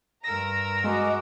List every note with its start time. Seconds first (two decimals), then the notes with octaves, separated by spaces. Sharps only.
0.24 G2 A#4 A#5 E6 A#6
0.84 G#3 F#4 D#5 D6